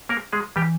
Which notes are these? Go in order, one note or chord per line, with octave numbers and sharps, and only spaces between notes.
A#3 A#4
G#3 G#4
E3 G3 G4